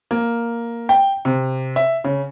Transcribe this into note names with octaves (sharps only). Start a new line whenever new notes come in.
A#3
G5
C3
E5
C#3